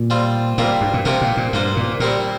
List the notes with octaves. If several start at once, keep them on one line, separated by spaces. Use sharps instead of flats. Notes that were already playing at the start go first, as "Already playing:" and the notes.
Already playing: A#2
G3 C4 F4
A#2 G3 C4 F4 A#4
G2
A#2
C3 F3 C4 G4 A#4
A#2
A#2
G2 A#3 F4 C5
A#2
A#2 G3 C4 G4 A#4